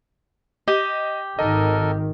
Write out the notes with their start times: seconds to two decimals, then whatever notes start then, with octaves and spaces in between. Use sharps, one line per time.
0.68 G4 D#5
1.39 G#1 D#3 A4 A#4 D#5